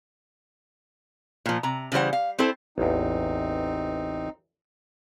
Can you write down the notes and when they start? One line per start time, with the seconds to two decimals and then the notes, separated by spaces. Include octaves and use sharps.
1.46 A#2 F3
1.63 C3 A#5
1.92 C#3 E3 G3 C5 F#5
2.13 F5
2.39 C4 E4 A4 C5
2.78 A1 E2 C4 D#4